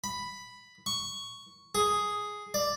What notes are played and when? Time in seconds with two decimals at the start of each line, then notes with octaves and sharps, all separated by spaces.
0.04 B5
0.86 C#6
1.75 G#4
2.54 D5